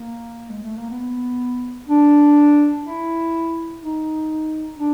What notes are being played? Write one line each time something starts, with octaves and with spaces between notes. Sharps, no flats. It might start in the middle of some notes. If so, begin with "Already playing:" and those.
Already playing: A#3
G#3
A3
A#3
B3
D4
E4
D#4
D4